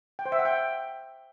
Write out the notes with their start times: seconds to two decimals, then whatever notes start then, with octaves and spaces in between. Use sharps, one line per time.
0.19 G5
0.26 C5
0.32 E5
0.39 F#5
0.45 G5